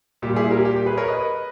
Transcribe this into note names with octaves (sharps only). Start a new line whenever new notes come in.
A#2 G3 G4
E4 G#4
G4 A#4
G4
G4
G#4 B4
A#4 C#5
B4 D#5